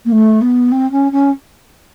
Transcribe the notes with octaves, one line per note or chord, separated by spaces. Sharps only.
A#3
A3
B3
C4
C#4
C#4